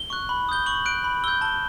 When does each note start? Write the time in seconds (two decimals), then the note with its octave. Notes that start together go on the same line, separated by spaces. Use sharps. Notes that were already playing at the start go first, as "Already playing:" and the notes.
Already playing: G7
0.10 C#6 F#6
0.29 B5
0.49 D#6 G6 G7
0.66 C#6 F#7
0.85 F#6 D7
1.04 B5
1.24 E6 G6 G7
1.41 A5 G7